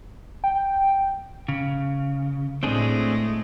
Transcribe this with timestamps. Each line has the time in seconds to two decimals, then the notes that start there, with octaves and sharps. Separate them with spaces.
0.44 G5
1.49 C#3
2.63 A2 G#3 A3 C4 D4 G#4